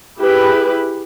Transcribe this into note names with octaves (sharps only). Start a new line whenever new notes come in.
E4 G4 G#4 B4